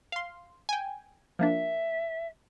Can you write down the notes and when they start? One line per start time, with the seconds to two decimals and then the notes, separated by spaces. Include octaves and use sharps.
0.12 F5 C6
0.69 G5 G#5
1.39 F3 A#3 D4 E5